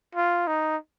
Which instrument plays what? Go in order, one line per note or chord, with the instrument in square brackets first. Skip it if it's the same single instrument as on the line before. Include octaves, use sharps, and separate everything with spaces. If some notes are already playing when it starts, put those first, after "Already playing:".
[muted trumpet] F4
D#4